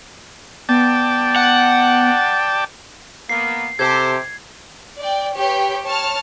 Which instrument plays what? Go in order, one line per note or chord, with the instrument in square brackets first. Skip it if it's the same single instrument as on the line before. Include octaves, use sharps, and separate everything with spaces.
[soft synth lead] B3 [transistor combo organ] D5 G5 A5
[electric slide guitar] F#5
[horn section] A#3 B3 [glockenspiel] C7
[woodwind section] C3 G4 [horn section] A4 C5 [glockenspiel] G#6
[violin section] D5 G5
G4 B4 C#5 G5
C#5 A5 F6